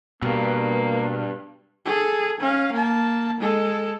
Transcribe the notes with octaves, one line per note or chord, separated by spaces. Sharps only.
G2 B2 A#3
G#4 A4
C#4 F5
A#3 A5
G#3 A4